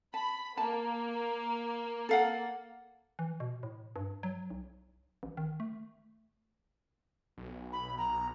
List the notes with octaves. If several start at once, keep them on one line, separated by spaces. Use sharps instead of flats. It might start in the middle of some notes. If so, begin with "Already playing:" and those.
A5 B5
A#3 A5
A4 F5 F#5
E3
B2
A2
G2
F#3
B1
A1
D#3
A3
B1
B5
A#5